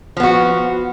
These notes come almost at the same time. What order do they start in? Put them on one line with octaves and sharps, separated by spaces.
F3 B3 F#4